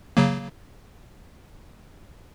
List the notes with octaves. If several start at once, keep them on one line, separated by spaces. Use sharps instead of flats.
C#3 F#3 A#3